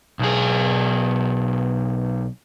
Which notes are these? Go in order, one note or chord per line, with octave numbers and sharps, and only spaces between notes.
B1 G#4